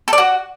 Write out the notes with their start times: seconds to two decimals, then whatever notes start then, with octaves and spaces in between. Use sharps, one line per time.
0.08 A4
0.13 D5
0.18 F#4